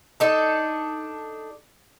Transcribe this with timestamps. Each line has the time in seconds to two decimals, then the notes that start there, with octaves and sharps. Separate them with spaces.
0.20 D4 D#4 A4